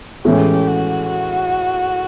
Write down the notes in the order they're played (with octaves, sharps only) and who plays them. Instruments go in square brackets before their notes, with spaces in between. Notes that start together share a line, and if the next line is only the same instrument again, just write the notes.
[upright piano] A2 E3 G#3 C#4 [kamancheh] G4
[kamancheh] F#4
F#4